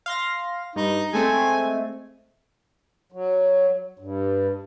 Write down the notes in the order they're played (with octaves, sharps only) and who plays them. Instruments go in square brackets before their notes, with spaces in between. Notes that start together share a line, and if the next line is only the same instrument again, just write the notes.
[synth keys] F5 C6 A#6
[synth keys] G2 [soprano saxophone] D#4
[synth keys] G#3 A3 C4 [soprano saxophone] G#5
[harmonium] F#3
G2